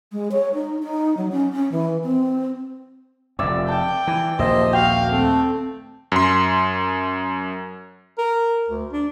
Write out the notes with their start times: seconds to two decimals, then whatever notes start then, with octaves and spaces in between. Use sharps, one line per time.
0.12 G#3
0.32 C#5
0.54 D#4
0.83 D#4
1.17 F#3
1.32 C#4
1.53 C#4
1.72 E3
2.04 C4
3.39 F1 F2 D5 E5 E6
3.68 G5 A5
4.07 E3
4.39 A#1 D#2 A#3 C5 D#5 E5
4.73 F#4 F5 G5
5.12 A3 C4
6.12 F#2 C6
8.18 A#4
8.68 D2
8.92 D4